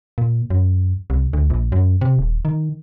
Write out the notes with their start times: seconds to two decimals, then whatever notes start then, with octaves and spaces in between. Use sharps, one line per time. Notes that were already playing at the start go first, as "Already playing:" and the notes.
0.18 A#2
0.50 F#2
1.10 C2
1.33 D2
1.50 A#1
1.72 F#2
2.01 C3
2.19 D#1
2.45 D#3